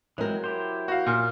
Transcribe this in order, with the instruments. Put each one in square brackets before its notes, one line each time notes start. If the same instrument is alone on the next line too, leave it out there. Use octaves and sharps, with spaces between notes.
[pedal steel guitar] E3 G#3 C4 [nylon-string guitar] F#3 A#4
[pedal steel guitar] E4 G4 C5
[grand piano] F#4 F5
[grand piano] A#2 [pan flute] F6